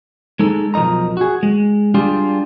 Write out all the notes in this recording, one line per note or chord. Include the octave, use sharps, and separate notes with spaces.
G#3 D#4 A4
B1 F3 A#4 D#5 A#5
F#4 G#4
G#3
G3 D4 F4 G4 G#4